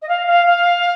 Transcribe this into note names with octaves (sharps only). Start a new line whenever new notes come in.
D#5
F5
F5
F5